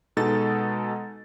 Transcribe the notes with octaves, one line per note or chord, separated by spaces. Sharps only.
B2 G#3 D#4 A4 A6